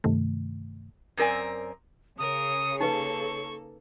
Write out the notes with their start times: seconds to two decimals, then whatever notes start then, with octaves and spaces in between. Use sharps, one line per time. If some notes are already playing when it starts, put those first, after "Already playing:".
0.04 G2 C3 D#3 A3
1.17 F#2 C4 A#4 D5 G#5
2.18 C#3 G#4 A#4 C#5 D#6
2.81 A#3 D#4 A4 B4 C#6